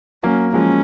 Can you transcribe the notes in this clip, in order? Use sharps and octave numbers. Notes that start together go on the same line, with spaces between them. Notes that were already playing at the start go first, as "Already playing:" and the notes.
F#3 A#3 C#4
F3 G#3 C#4